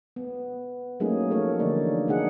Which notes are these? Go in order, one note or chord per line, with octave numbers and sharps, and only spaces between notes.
B3
F#3 A3 A#3 C#4 D#4 G#4
F3 A3 A4 A#4 C#5
D3 E3 A3 A#3 D#4 D5
C3 G#3 D4 D#4 G#4 F#5